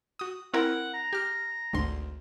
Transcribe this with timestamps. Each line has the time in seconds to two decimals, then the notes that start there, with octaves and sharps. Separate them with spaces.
0.19 F#4 D#6
0.54 C4 E4 A#4 F#5
0.94 A#5
1.13 G4 F6
1.73 G#1 D2 C6